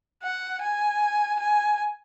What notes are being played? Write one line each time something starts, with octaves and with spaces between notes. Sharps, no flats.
F#5
G#5
G#5